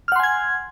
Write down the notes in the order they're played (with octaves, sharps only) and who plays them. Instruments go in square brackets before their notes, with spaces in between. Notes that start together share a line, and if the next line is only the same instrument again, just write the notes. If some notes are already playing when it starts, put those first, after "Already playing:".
[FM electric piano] F6
F#5
C6
G#5
G#6